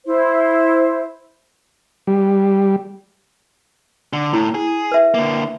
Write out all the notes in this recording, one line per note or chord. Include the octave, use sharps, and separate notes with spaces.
E4 C5
G3
D3
A2 E4
G#4
B4 E5
D3 A#3